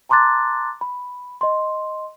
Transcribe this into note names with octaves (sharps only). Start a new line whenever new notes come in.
A5 A#5 C6 D6 F#6 A6
B5
D#5 C6